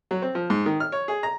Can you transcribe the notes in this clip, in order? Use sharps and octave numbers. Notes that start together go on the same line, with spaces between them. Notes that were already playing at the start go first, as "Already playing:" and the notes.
F#3
C4
F3
G#2
D#3
F6
C#5
G#4
A#5